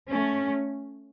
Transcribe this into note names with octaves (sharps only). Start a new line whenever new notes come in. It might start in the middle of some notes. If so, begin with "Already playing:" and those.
A3 C#4